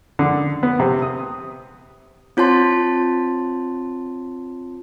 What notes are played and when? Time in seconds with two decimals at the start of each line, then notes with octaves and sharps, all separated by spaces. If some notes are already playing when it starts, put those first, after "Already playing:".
0.19 D3
0.63 B3
0.80 C3
1.02 D#6
2.37 C4 F4 C#5 A5 C6